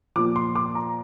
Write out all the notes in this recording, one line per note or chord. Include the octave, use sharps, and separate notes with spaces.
A#2 F3 D6
C6
D6
A#5